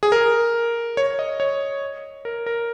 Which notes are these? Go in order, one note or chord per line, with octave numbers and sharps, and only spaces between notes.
G#4
A#4
C#5
D#5
C#5
A#4
A#4